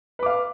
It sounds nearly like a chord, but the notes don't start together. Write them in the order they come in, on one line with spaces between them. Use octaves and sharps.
B4 D6 F5